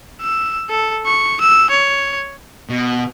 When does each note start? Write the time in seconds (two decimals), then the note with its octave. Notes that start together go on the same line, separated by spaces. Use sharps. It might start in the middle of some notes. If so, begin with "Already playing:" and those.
0.21 E6
0.69 A4
1.06 C#6
1.41 E6
1.70 C#5
2.69 B2